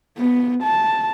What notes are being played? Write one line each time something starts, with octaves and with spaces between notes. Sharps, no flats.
B3
A5